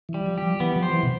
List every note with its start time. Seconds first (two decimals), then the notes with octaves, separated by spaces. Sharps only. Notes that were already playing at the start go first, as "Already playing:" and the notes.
0.09 E3
0.14 G3
0.26 F3
0.38 G4
0.43 F3
0.60 E3 B3
0.76 F3
0.83 C5
0.93 E3
1.03 B2